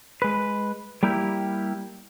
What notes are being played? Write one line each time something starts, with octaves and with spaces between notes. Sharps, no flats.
G#3 B4
G3 A#3 E4 G4